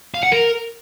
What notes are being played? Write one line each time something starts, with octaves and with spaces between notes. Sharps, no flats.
F5
F#5
A#4